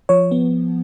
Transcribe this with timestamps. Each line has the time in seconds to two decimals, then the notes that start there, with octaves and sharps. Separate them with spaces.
0.09 F3 C#5
0.31 B3